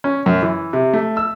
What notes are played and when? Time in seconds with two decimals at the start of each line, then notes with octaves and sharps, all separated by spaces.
0.04 C#4
0.26 F#2
0.43 E3
0.73 C3
0.94 A3
1.17 E6